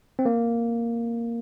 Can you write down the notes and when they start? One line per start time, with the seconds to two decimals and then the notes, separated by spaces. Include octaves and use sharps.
0.19 C4
0.25 A#3